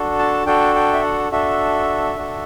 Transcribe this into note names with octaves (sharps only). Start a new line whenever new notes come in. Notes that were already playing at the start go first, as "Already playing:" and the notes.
Already playing: D4 F#4 A4
A5
D4 F#4 A4 G5
G5
E5
F#5
D4 F#4 A4 E5
D4 F#4 A4